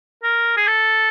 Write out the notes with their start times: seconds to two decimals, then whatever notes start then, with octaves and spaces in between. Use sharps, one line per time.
0.23 A#4
0.57 G#4
0.67 A4